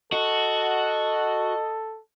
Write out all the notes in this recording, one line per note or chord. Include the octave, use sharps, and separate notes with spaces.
F#4 A4 D#5